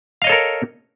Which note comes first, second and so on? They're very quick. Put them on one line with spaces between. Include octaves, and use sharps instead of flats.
F5 D#5 C#5 A4 A#4